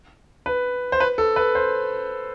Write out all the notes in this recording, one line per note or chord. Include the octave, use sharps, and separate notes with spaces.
B4
C5
B4
A4
B4
C5